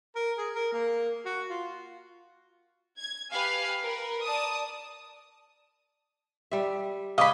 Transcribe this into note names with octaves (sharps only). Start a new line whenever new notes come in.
A#4
G#4
A#4
A#3
F#4
F4
G#6
G4 B4 F5 G#5
A#4 B4
D5 A5 D#6
G3 E5
C#3 G#3 C#4 D#5 F5 B5 D6